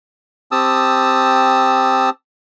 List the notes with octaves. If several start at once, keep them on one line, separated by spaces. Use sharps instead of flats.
C4 G4 A5 D#6 E6